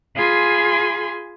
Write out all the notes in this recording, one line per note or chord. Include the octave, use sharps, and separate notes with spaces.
F4 G#4 G#5 B5 C6